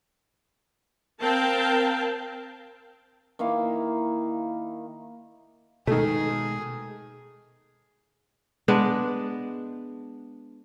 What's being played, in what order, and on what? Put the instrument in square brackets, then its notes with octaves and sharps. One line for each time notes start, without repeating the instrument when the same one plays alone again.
[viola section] C4 A#4 F5 G5 A5
[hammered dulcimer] D#3 A#3 E4 F5
[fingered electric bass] B2 G#3 [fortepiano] D#3 A3 [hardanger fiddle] G#4
[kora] G#3 B3 D4